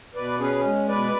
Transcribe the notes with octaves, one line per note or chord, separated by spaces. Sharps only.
B2 B4 D5
C#4 G#4 B4
G#3
B2 B4 D5